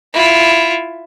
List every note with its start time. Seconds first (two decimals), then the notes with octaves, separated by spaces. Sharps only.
0.14 E4 F4